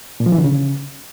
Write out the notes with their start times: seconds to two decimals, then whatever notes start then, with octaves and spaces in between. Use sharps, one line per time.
0.20 A#2
0.26 F3
0.32 E3
0.38 D3
0.44 C#3